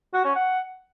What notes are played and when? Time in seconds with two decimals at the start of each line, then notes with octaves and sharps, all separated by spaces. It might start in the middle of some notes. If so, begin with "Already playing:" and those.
0.14 F#4
0.25 C#4
0.36 F#5